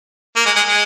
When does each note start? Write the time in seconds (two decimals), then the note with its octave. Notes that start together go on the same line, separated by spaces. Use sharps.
0.36 A#3
0.45 G#3
0.56 G#3
0.66 G#3